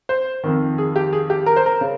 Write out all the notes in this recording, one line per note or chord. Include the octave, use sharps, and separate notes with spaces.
C5
F2 D#3
G#4
G4
G#4
G4
A#4
C5
A#4
C#3